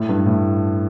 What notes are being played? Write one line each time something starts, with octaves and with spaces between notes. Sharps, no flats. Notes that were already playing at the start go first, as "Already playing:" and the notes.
Already playing: A2
G2
A2